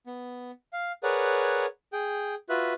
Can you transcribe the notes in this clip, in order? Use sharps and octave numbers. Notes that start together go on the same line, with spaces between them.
B3
F5
G#4 A#4 B4 C#5 D5 F#5
G#4 G5
F4 F#4 B4 E5 F#6